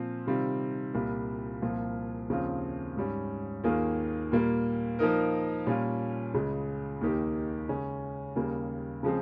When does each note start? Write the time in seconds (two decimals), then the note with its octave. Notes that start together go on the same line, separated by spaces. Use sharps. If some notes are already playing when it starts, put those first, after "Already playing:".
Already playing: A#2 F3 C4 F4
0.27 C3 D#3 G3 C4 F4
0.94 C2 A#2 G3 A#3 F4
1.62 C2 A#2 F3 A#3 F4
2.30 D#2 C#3 F3 C4 F4
2.96 G#2 G3 C#4
3.64 D#2 D#3 A#3 F4 G#4
4.32 A#2 G3 A#3
4.99 F3 A#3 D#4 A#4
5.66 A#2 G3 C#4 F4
6.34 C#2 C#3 G#3
7.01 D#2 D#3 A#3 D#4 G4
7.69 C#3 G#3 C#4
8.35 D#2 C#3 G3 A#3
9.03 C#3 F3 G#3 C4